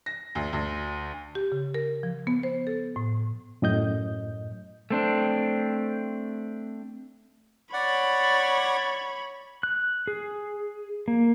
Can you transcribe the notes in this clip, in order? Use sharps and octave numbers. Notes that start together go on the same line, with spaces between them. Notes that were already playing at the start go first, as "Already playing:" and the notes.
A#6
D2
D2
G4
C#3
A#4
F3
B3
C5
A4
A2
F#2 A2 D#5 G6
A3 C4 D4
C#5 D5 F#5 B5
F#6
G#4
A#3